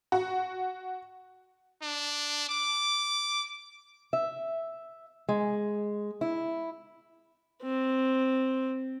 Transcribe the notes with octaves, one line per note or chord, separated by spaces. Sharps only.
F#4
D4
D6
E5
G#3
E4
C4